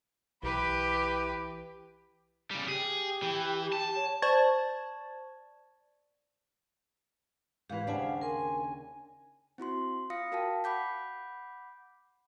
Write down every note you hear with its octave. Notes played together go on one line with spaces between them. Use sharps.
B1 E3 G4 B4 B5
C#3 G3
G4 G#4
E3
A5
C#5
C5 D5 A5 C#6 G#6 A6
G#2 E3 G4 B4 F5
D#2 C#3 D4 C5 F#5 G#5
A#4 G#5 C6
C4 E4 F#4 C6
F4 F5 D#6 A#6 C#7
F#4 A#4 F5 G5 A5
F#5 B5 D6 G6 B6